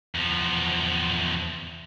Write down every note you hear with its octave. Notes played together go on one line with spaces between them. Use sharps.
E2 F3